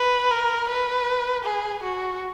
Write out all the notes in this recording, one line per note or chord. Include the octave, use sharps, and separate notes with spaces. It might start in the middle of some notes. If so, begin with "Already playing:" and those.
Already playing: B4
A#4
B4
G#4
F#4